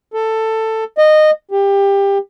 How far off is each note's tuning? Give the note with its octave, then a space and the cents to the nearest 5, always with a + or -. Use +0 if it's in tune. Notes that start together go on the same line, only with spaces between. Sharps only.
A4 +10
D#5 -15
G4 +20